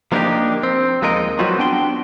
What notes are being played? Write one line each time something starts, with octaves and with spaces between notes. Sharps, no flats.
F3 A#3 B3 D4 D#4 G4
C4
D#2 F3 G#3 D#4 A#4 D#5
F#3 G3 B3 C4 F4 F#4
B3 D4 G5 C6